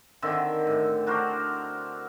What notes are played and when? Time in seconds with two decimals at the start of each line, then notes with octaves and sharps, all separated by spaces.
0.22 D3 D#3 C4 E5
0.67 A2
1.07 D4 F#4 A#4 C5